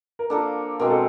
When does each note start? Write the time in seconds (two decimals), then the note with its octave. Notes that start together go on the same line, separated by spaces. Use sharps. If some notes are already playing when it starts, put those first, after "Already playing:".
0.19 A#4
0.30 F3 A#3 D4 A4
0.80 B2 G#3 C4 A#4
0.90 A4